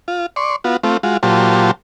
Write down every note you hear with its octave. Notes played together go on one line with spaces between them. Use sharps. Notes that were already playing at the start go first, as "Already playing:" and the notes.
F4
D5 C6 C#6
B3 F4 F#4
A3 C4 F4
G#3 F4 F#4
A#2 F#3 F4 G4 C5 A5